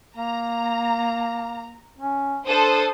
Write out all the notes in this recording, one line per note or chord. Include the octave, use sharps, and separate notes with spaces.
A#3 A#5
C#4
D4 A4 C5 D#6